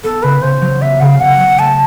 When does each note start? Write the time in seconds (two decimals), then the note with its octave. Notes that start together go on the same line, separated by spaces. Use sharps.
0.04 B3 A4
0.23 C#3 B4
0.42 C#3 C5
0.61 F#3
0.82 B3 E5
1.00 C#3 F5 F#5
1.20 C#3 F#5
1.40 F#3
1.59 A3 A5